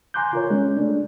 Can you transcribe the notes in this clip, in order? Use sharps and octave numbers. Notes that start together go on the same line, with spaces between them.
G#5 A#5 C6 D6 F#6 G6
F4 A#4 C#5
G#3 C#4
A3 D4